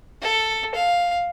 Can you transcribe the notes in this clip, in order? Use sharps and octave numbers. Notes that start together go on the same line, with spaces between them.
A4
F5